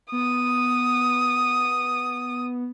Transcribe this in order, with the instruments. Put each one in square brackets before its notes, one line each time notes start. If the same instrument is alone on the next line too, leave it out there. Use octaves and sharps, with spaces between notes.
[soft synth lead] B3 [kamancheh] D#6